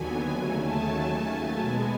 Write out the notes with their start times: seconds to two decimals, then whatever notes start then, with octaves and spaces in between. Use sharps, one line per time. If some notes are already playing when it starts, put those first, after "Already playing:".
Already playing: D#2 D3 F#3 B3 G#5
0.31 D#2 C#3 F#3 A3 G#5
0.63 A5
0.95 G#5
1.58 B2 G#3 B3